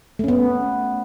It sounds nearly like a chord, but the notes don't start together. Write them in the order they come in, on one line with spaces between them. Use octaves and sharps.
A3 C#4 B3